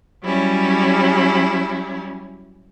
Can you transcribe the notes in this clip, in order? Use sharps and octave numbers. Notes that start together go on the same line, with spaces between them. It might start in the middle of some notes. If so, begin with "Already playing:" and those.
F#3 G3 C#4 E4